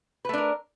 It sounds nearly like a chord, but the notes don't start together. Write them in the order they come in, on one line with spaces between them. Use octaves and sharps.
B4 A3 D4 A#4